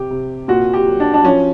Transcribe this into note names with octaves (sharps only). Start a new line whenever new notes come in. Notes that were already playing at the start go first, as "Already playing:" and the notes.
Already playing: C3 G4
C3
A#2 F#4
G4
F#3
D4
D4
F3 C#4